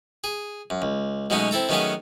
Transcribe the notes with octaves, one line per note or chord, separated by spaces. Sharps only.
G#4
F#2
C#2
B2 F#3 G#3 A3 C#4 D#4
C4 E4 A4 A#5
D#3 F#3 A3 B3 C#4 G#4